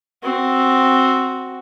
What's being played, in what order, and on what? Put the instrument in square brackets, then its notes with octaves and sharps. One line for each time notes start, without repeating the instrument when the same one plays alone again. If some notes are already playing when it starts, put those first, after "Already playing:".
[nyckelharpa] C4 F#4